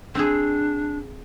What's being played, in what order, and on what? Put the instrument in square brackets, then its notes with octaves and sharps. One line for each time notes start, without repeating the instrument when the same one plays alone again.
[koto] C4 G#4 [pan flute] D4